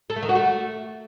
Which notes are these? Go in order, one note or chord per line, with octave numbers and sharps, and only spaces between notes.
A4
A3
D#3
F#4
A3